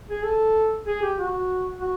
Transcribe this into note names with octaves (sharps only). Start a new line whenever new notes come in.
G#4
A4
G#4
G4
F#4
F#4